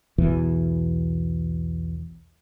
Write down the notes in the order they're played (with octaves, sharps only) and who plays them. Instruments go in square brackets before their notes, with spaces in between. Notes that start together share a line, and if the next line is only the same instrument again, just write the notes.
[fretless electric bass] B1 E2 B2 E3